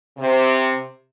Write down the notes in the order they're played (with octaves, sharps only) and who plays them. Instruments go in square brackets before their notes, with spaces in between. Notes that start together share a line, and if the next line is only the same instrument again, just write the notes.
[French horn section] C3